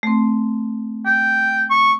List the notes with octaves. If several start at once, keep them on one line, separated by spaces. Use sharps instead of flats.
A3 C4
G5
C#6